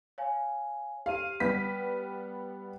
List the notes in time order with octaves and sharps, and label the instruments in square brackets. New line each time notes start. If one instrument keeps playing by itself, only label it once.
[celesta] C#5 F5 G#5
[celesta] G4 F6 D#7 [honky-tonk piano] F5
[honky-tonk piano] G3 B3 B6